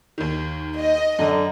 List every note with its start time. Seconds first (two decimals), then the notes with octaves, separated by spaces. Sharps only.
0.18 D#2 D#3
0.78 D#5
1.19 F#2 D3